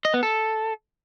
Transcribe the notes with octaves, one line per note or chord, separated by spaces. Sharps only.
D#5
B3
A4